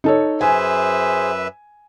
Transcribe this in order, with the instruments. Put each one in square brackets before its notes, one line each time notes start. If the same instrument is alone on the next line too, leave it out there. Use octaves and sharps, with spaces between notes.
[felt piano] D#4 A4 C#5
[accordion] F#2 B4 E5 [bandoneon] G#4 C5 [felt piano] G#5